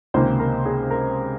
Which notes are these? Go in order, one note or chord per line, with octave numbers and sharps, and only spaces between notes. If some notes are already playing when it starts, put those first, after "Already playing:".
C#2 C3 D#3 A#3 C5
A#4
G#4
A#4